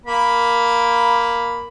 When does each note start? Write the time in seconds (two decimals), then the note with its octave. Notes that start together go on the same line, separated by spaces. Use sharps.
0.06 A#3 B5